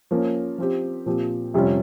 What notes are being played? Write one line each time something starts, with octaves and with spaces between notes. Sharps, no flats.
F3 A#3 C#4
F3 C4 G4
A#2 F3 C4 G4
F2 C3 G3 C#4 F4